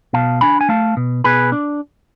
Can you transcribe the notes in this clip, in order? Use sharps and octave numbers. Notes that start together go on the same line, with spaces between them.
B2 F5 A5
D4 G#5 B5
G#5
A3 F5 A5
B2
B2 G#4 B4
D4